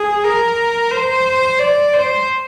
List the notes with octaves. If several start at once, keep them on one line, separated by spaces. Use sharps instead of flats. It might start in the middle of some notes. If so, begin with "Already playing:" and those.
Already playing: G#4
A#4
C5
D5
C5